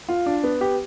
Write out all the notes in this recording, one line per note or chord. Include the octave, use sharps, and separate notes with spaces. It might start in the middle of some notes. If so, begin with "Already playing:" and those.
F4
D4
B3
G4